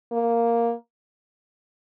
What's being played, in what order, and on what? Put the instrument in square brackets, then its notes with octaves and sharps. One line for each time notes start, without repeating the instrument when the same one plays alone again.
[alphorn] A#3